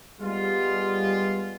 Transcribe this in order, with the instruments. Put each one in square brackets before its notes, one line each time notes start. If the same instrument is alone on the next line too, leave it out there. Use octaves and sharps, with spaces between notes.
[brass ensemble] G3 G#3 B3 F4